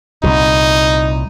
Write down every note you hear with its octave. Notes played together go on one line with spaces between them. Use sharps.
C2 A#2 D#4